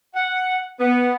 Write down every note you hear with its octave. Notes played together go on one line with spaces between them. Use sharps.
F#5
B3